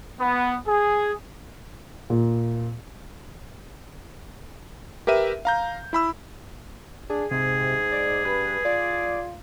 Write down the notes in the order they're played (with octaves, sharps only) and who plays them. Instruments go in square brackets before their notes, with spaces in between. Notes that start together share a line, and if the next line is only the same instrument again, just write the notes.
[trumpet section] B3
G#4
[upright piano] A#2
[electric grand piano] G4 A#4 B4 E5 D#7
F5 A#5 G6
E4 B5 E6
[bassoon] D4 [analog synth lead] G#4
[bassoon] G#2 [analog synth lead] C3 [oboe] G#4
[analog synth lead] D5
[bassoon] G2 [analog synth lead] B4
[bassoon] F4 [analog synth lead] D5